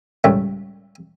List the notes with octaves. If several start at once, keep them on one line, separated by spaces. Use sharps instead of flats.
C#2 A2 G3 A3